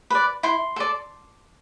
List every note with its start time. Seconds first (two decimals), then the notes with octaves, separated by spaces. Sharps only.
0.10 B4 D5
0.43 E4 C6
0.76 A4 D5